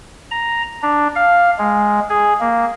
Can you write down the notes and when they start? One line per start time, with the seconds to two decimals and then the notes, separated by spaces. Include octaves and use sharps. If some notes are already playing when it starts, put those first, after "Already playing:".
0.31 A#5
0.82 D4
1.16 F5
1.59 G#3
2.10 G#4
2.41 A#3